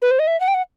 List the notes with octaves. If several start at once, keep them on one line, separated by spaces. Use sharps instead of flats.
B4
C5
D#5
E5
F#5
G5
F#5